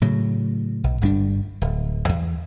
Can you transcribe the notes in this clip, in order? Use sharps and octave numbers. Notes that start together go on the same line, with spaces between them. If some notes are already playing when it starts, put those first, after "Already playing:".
A2 C#3 F#3
B1
G1 G2 G3 D4
D1
E2